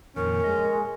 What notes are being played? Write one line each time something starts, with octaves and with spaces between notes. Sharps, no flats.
F2 A#2 D#3 C#4 A#4
G#3 D#5